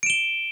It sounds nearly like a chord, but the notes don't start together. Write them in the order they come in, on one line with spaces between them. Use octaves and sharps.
D7 E7 G7